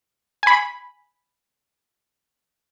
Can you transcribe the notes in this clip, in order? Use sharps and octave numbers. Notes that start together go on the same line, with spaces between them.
G#5 B5